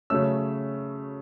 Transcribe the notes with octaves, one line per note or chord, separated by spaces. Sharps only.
C#3 F#3 A3 C#4 E6